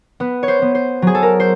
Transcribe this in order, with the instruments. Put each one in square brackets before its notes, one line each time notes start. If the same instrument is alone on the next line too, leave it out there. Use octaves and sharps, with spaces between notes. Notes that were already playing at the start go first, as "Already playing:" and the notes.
[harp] B3 B4
C#5
C5
B3
C5
F#3 G#4
A4
A#4
C5